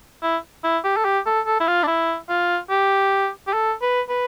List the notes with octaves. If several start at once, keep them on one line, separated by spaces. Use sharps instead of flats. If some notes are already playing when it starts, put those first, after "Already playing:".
E4
E4
G4
A4
G4
A4
A4
E4
F4
D4
E4
F4
G4
G4
A4
B4
B4